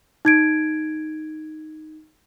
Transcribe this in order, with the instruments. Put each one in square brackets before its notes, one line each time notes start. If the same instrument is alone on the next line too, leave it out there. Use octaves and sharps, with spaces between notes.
[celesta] D#4 G#6 D7